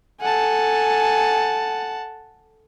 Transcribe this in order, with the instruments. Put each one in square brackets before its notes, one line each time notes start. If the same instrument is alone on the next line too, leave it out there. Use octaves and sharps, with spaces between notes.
[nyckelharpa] A4 G#5 [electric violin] F#5 A5